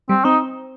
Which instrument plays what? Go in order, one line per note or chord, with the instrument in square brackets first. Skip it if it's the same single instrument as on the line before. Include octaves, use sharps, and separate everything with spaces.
[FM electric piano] G3 [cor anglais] C4
[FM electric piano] C4 [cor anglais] D#4